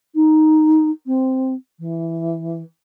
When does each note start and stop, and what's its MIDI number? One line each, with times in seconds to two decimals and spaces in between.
0.15 0.89 63
1.06 1.53 60
1.79 2.62 52